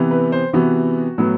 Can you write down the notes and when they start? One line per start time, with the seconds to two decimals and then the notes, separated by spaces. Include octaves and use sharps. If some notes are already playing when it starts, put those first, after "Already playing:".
Already playing: C3 E3 B3
0.11 B4
0.32 C5
0.53 C3 E3 B3 F#4
1.18 A2 F#3 B3